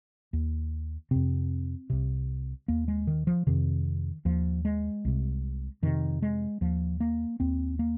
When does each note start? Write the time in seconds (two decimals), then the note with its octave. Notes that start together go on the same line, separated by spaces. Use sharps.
0.33 D#2
1.11 F2 C3 C4
1.90 C2 C3
2.68 D#2 A#3
2.88 G#3
3.07 D#3
3.27 F3
3.47 F2 C3 D#3
4.25 D#2 F3
4.65 G#3
5.05 C2 C3
5.82 F2 C3 D#3
6.22 G#3
6.61 D#2 F3
7.00 A#3
7.40 D#2 C4
7.79 A#3